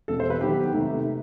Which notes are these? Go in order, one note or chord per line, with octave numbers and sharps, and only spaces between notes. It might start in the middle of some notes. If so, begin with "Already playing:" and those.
E2 B2 G3 A4
C5
B4
D#3 F#3 B3 G4
C3 D#3 A3 D#4